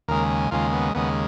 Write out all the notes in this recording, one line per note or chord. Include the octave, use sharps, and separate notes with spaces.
D#2 C#3 G#3 A#4
D#2 C#3 G#3 F4
B3
D#2 C#3 G#3 B3